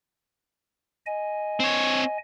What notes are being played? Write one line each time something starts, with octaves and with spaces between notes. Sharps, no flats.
D#5 G#5
C4 C#5